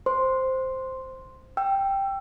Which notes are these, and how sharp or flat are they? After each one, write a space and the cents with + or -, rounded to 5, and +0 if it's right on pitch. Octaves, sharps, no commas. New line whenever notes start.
C5 +0 C6 +0
G5 +0 E6 +25